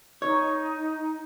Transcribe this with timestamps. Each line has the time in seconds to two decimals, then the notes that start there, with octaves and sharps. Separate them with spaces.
0.22 D#4 C#5